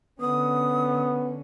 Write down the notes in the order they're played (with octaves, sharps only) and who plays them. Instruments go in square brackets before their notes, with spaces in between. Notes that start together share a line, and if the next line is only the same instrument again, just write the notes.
[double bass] D3 C#4 [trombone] B3 [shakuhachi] D#6